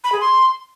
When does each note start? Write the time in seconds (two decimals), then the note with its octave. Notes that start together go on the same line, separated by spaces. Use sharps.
0.04 B5
0.12 G#4
0.21 C6